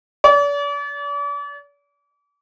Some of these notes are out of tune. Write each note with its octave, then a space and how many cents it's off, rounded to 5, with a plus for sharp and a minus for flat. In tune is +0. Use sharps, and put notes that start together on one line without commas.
D5 -40